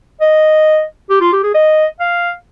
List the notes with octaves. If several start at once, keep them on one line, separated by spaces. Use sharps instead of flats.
D#5
G4
F4
G4
G#4
D#5
F5